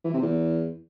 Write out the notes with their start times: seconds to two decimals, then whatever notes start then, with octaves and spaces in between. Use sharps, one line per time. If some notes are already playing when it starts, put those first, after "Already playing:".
0.04 E3
0.13 C3
0.22 E2